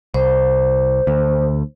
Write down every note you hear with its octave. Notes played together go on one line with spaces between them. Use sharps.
C2 C5
D2